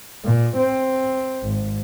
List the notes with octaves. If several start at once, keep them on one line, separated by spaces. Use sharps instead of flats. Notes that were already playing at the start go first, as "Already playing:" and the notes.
A#2
C4
G#1